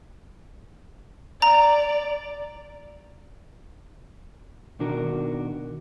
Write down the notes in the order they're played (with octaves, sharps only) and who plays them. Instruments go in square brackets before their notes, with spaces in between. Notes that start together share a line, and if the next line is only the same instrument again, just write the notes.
[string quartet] D5 [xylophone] A#5
[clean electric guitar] B2 D#3 D4 F#4 A#4